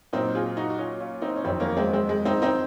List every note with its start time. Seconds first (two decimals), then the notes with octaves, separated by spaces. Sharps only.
0.13 A#2 F#3 C4 D#4
0.35 F4 G#4
0.57 D#4 F#4
0.70 F#4
0.78 C#4 F4
1.01 C#4 F4
1.22 C4 D#4
1.36 C#4
1.44 F2 D#3 F#3 C4 D#4
1.60 A#3 C#4
1.77 G#3 C4
1.93 G#3 C4
2.09 G#3
2.25 C4 D#4
2.42 C4 D#4